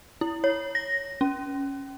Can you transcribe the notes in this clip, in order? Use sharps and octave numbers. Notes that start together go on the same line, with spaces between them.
E4
C#5
A#6
C#4